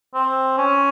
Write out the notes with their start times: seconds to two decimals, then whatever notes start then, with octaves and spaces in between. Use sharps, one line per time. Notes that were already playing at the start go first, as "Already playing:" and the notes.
0.14 C4
0.58 C#4